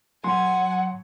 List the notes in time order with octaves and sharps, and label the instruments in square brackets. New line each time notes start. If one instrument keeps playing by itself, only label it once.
[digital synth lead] F#3 [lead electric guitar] F#5 [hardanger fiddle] G#5 [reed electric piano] C6